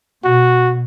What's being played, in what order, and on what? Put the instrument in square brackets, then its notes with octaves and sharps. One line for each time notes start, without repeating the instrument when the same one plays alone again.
[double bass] B2 [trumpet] F#4